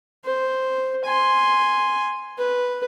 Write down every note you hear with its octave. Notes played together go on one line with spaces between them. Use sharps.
C5
G#5 C6
B4